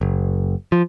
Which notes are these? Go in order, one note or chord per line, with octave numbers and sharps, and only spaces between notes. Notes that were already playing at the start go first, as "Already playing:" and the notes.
F#1
F3